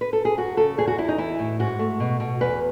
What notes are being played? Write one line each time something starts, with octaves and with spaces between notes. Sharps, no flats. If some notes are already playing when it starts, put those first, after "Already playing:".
B4
A4
G#4
F#2 F#4
C#3 A4
E2 G#4
F#4
E2 E4
D#4
E3 E4
A2
G#2 F#4
A3
B2
B2
E2 B4